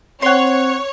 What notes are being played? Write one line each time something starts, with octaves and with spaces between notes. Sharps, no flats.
C4 C#5 F#5 C6